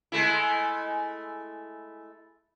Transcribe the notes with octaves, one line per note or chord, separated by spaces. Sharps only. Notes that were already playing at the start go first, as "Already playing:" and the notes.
G#3 A3 E4